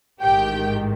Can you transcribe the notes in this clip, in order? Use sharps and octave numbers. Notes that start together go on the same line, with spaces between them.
A1 G#2 D#3 G4 G5